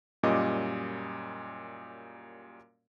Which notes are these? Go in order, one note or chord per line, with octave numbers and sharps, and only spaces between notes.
F#2 A#2 G3 C#4 D#5 D6